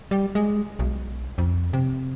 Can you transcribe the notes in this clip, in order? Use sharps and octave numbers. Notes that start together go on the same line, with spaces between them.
G3
G#3
B1
F2
C3